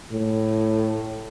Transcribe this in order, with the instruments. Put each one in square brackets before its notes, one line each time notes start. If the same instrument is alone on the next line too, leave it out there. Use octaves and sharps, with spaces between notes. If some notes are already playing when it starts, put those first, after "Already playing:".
[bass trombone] A2